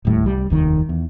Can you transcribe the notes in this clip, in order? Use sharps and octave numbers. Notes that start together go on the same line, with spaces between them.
D1 D#2 A2 G3
C2 G3
F1 D#2 D#3
E2